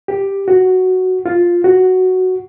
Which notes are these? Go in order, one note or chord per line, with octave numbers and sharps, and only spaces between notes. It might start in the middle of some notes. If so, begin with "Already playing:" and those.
G4
F#4
F4
F#4